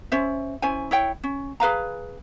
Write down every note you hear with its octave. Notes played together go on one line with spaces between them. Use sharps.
C#4 C5 E5
C#4 E4 C5 G#5
E4 C#5 G5
C#4
G#4 B4 F5 A#5